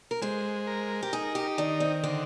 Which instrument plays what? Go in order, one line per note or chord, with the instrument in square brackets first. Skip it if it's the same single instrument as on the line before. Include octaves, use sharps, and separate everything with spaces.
[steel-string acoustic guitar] A#4
[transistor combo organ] G#3 [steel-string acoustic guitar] C5
[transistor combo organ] A#4
[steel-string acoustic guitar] G4
[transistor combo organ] D#4 [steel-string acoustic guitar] G#4
[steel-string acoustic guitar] G4
[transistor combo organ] D#3 [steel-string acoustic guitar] D4
[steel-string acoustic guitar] C4
[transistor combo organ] D3 [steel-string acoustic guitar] C4